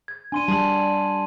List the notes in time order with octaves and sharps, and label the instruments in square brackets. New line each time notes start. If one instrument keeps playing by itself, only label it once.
[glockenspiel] G#6
[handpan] D4 [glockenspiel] G#5 C6 D#7
[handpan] G3 [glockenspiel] A5 F#7